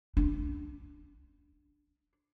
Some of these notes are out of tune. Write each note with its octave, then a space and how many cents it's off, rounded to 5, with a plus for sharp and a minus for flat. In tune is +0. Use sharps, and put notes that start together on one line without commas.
D4 +5